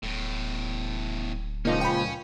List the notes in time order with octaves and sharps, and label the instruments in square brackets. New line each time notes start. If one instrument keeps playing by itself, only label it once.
[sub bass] D1 [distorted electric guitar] E2 A2
[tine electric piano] C#2 A#2 F3 [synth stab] A#3 D#4 [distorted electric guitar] C#4
[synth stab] G5 B5